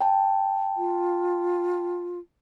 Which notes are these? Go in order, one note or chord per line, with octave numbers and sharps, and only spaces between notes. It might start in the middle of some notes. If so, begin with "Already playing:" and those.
G5 A5
F4